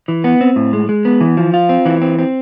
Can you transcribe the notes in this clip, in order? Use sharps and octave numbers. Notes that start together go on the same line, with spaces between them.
E3
B3
C4
A2
G#3
G#3
B3
E3
F3
F4
C4
E3
C4
C4